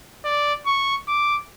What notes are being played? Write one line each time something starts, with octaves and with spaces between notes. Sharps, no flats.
D5
C#6
D6